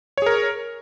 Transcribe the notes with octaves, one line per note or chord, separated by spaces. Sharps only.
G#4 A#4 C#5